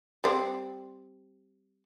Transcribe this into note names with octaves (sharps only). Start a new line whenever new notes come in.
G3 C4